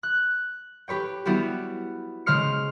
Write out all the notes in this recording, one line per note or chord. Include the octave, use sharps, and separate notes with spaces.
F#6
G4 B4 C#5 G5
G3 B3 E4 F#4 G4
C#3 G#3 C5 F6 C#7